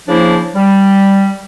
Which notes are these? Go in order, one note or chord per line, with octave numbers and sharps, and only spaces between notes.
C#3 F3 A#3 D4 E4 C5
G3